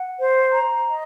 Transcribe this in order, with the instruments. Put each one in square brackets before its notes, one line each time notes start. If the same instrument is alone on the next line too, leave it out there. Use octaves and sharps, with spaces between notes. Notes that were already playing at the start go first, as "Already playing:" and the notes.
Already playing: [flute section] F#5
C5
A#5
D#5